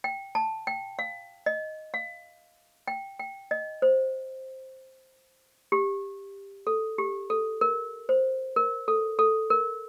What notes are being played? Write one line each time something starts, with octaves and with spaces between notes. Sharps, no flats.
G5
A5
G5
F5
D#5
F5
G5
G5
D#5
C5
G4
A4
G4
A4
A#4
C5
A#4
A4
A4
A#4